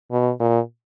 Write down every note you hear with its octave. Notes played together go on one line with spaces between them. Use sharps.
B2
A#2